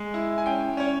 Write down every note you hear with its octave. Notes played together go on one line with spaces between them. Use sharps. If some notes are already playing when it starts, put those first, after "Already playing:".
Already playing: G#3
E4
G#5
C#4 G5
C#4 C#5